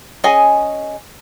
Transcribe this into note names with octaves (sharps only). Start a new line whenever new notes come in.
C#4 G#4 D#5 G#5